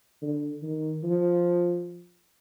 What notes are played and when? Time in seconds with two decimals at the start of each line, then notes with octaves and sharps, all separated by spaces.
0.22 D3
0.62 D#3
1.03 F3